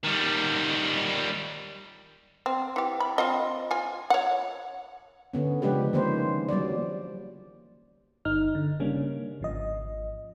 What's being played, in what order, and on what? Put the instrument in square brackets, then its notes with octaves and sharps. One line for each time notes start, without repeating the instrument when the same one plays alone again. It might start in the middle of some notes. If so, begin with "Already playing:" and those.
[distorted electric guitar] D#3 G3
[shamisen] C4
E3 G4
B5
C4 F4 D#5
F4 G#5
C#5 F#5
[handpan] D3 B3 C#4
C#3 F3 G#3 D4 G4 B4
D#3 F3 A#3 C#4 C5
F#3 G3 A#3 D5
[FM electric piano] G1 D#4 F6
D3
C#3 G3 A#3 C#4 D4
G#1 F3 D#5